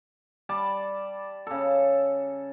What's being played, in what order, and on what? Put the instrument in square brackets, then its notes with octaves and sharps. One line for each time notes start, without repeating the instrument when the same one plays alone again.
[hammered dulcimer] G3 D5 A5
C#3 A4